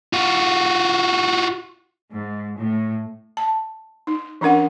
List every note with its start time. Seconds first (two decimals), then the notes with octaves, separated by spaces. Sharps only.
0.13 F4 F#4
2.11 G#2
2.57 A2
3.37 A5
4.07 D#4
4.41 E3 C#4 D4 A#4 F#5